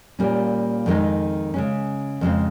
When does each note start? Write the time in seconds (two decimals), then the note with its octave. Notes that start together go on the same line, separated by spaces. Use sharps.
0.19 A#2 G3 A#3 C#4
0.86 F2 D#3 G#3 D#4
1.54 C#3 G#3 C#4
2.21 F2 C#3 G#3 C4